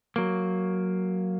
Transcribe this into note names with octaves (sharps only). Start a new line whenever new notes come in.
F#3 A#3